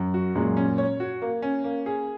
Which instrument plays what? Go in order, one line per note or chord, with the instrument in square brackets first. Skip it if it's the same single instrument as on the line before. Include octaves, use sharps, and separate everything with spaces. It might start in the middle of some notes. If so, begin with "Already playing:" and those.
Already playing: [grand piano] F#2
[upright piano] F#4
[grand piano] F#2 A#2 [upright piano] G#3
[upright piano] C#4
C#5
F#4
A#3
C#4
A#3
G#4